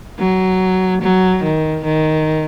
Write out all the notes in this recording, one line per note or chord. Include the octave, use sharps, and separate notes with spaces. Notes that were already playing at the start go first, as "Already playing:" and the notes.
F#3
F#3
D#3
D#3